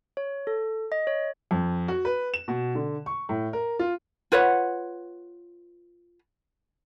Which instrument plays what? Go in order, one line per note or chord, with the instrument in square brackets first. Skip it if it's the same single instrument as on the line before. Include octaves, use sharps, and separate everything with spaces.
[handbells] C#5
A4
D#5
C#5
[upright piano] F2
F#4
B4
E7
B2
D3
C#6
A2
A#4
F4
[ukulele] F4 B4 C#5 F#5